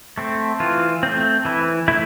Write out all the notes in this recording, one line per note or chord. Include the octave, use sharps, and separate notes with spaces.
A3 C4
E3 F4
A3 C4
E3 E4
A3 E4